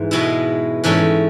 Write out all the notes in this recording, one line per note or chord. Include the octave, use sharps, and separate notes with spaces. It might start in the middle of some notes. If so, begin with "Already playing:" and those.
Already playing: G#2 E3
B2 G#3 B3 E4
G#2 E3 A3 C#4 E4